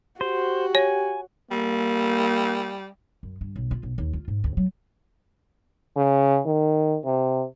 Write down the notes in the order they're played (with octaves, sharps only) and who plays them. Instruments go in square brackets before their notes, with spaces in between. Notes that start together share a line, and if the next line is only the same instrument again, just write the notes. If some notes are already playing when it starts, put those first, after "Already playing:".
[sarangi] F#4 [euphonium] G4 [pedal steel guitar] C5
[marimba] C#5 [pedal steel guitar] G#5
[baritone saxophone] G3 [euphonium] A#3
[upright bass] F#2
G2
B1
F4
B1
D#2
F4
G#2
D2
F#3
[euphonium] C#3
D#3
C3